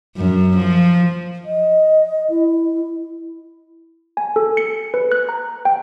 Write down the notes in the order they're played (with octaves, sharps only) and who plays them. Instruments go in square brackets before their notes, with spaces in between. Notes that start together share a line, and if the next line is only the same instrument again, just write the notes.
[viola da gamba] F#2
F3
[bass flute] D#5
E4
[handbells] G#5
A4
C#7
B4
F#6
A#5
G5